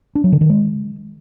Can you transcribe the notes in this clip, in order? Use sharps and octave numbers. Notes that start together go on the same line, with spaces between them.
D4
F#3
D3
D#3
G#3